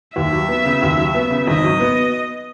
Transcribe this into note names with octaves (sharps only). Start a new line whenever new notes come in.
D#2 E5
F#3
B3
C#3
D#2
F#3
B3
C#3
G#1 D#5
F#3
B3